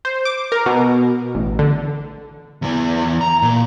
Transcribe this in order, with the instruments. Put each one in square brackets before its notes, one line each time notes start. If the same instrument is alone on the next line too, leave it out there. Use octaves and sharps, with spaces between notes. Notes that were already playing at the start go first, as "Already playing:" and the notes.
[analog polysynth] C5
D6
A#4
B2
A1
D3
[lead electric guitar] E2 E3
A#5
A#2